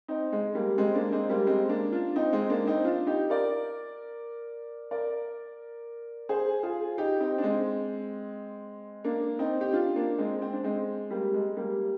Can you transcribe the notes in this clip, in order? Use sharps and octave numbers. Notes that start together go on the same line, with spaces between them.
C4 D#4
G#3
G3 A#3
G#3 C4
A#3 D4
G#3 C4
G3 A#3
G#3 C4
A#3 D4
D4 F4
C4 D#4
G#3 C4
A#3 D4
C4 D#4
D4 F4
D#4 G4
A#4 D5
A#4 D5
G#4 C5
F4 G#4
D#4 G4
C4 D#4
D4
G#3 C4
A#3 D4
C4 D#4
G4
D4 F4
A#3 D4
G#3 C4
C4
D4
G#3 C4
G3 A#3
G#3
G3 A#3